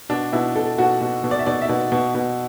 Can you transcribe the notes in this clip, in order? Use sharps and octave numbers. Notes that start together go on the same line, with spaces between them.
B2 D4
B2 E4
B2 A4
B2 F#4
B2
B2
D5
E5
B2 D5
E5
B2
B2
B2